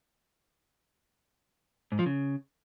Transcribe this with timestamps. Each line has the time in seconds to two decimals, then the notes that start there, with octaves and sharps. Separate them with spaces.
1.92 G#2
1.99 F3
2.06 C#3